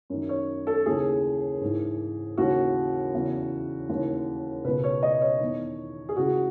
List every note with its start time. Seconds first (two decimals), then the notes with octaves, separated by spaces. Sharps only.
0.10 F#2 D#3
0.29 C#5
0.67 A4
0.86 D#2 C#3 E3 G#4
1.61 G#2 E3
2.37 D#2 C#3 E3 F#4
3.14 E2 C#3 E3
3.89 D#2 C#3 E3
4.65 C#2 B2 B4
4.84 C#5
5.03 D#5
5.22 C#5
5.40 E2 D#3
6.09 G#4
6.16 C#2 C#3 E3 F#4